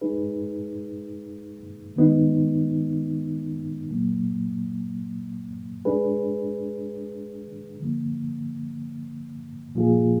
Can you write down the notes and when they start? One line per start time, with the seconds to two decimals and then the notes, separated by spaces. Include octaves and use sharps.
0.01 G#3 D#4 G#4 B4
1.96 D#3 G#3 B3 D#4
3.91 A#2 F#3 A#3
5.85 G#3 D4 G#4 B4
7.80 D3 F3 A#3
9.75 A#2 F3 A#3 F4 G#4